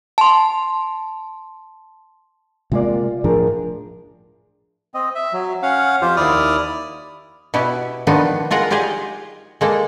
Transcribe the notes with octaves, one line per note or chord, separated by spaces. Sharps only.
A5 C6
C3 G#3 A#3 F4 D5
A2 F3 D4 G#4 A#4
C4 D#5
E5
F#3
C#4 F5 F#5
F2 F4 G4 C5
D#2 E4 D5 D#6 F6
B2 B3 E4 G4
D#3 F3 B3 D4 D#4
G#3 F4 A#4 F#5
F4 G4 G#4 D#5 F5
G#3 A#3 A4